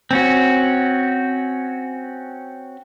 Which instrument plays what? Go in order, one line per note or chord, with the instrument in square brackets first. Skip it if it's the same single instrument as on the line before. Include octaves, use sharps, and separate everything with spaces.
[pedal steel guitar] C4 C#4 F#4